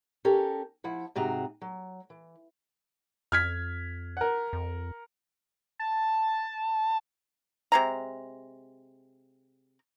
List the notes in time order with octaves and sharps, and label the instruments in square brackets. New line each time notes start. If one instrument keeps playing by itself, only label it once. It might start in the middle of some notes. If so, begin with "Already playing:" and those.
[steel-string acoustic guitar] C#4 G4 A4 A#4
F3 E4 F#5
G#2 C3 F#4 G#4 A#5
F#3
E3
[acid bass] F2 [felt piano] F6 G#6 B6
[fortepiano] A#4 F#5
[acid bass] F2
[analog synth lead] A5
[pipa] C3 G#3 A#5